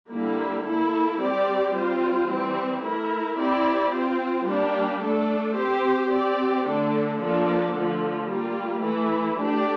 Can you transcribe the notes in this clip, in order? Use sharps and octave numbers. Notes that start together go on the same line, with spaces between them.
D3 G3 A#3 E4
A#3 E4 A4
G3 C4 G4 D5
G3 C4 F4 C5
E3 G3 C4
A3 E4 A#4
C4 E4 G4 D5
C4 F4 C5
G3 A#3 D4 G4
A3 D4 A4
C4 G4 C5
C4 G4 D5
D3 A3 D4 A4
F3 A#3 D4 A4
D3 F3 A3
G3 A#3 F4
E3 A3 E4
A3 D4 G4 D5